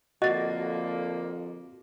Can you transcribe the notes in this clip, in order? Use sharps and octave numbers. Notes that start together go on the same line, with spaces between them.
F2 D3 A#3 F#4 D#5 A6